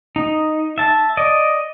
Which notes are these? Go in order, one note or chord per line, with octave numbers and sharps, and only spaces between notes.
D#4
E5 A5
D5 D#5